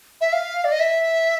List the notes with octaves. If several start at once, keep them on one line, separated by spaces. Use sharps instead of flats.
E5
F5
D5
D#5
E5